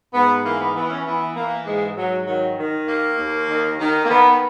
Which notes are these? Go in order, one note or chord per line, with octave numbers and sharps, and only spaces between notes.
G#2 B3
E3 A#3
B3
E3 B3
C#4
E3 B3
E3 A#3
G#2 G#3
G#2 F#3
D#3 F#3
D#3
D#2 A#3
D#2
D#3
D#3
A#3
D#3 B3